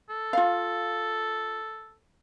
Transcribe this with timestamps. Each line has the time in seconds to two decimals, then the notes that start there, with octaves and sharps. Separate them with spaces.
0.09 A4
0.33 F4 F5